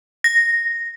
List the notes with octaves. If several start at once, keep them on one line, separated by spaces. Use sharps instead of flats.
A#6